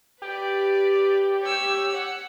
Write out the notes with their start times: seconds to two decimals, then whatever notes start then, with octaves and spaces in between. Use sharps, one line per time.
0.22 G4 B4 D5
1.41 C#5 E6
1.93 F#5